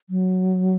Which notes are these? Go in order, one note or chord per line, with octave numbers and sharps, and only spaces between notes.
F#3